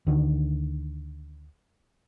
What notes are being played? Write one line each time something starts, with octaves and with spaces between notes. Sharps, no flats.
D2 D3 D#3